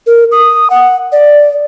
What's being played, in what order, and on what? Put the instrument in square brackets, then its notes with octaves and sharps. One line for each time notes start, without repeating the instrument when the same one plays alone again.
[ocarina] A#4
D#6
F#5
D5